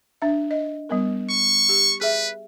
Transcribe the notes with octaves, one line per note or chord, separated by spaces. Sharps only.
D4 E5
D#5
G3 B3 A#4
C#6
G4
G#4 B4 E5